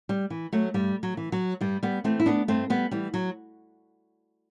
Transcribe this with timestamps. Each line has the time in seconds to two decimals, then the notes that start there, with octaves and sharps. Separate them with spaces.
0.09 G3
0.30 E3
0.53 F#3 A3
0.74 G2 G3
1.03 F#3
1.17 E3
1.32 F#3
1.61 G2 G3
1.83 G3 B3
2.04 E3 A3 C4
2.20 E4
2.26 B3 D4
2.48 G2 A3 C4
2.70 G3 B3
2.91 E3 G3
3.14 F#3